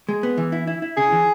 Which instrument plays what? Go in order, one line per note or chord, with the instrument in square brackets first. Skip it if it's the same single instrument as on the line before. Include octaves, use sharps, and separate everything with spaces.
[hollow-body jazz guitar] G#3
B3
E3
E4
E4
E4
[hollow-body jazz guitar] C#3 [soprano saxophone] G#4
[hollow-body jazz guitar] E3